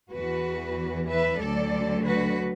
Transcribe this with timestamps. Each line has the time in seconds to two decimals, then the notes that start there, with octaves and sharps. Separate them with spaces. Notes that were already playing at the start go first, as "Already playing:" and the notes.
0.12 E2 E3 F#4 B4
1.09 B4 E5
1.40 D2 D3 F#3 A4 D5
2.05 F#4 B4